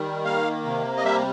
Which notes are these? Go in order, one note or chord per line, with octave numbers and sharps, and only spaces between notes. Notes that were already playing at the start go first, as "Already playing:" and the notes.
Already playing: D#3 G3
A#3 F5
C3
D#5
G3 E5